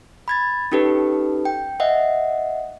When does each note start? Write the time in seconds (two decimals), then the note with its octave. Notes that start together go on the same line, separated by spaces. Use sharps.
0.28 B5 G#6 A6
0.72 C#4 D#4 G4 A4 B4
1.45 G5
1.80 D#5 E5 F#5